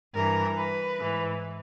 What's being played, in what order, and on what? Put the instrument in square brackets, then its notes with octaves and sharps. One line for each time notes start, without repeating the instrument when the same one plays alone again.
[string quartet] G2 E3 A#4
B4
G#2 E3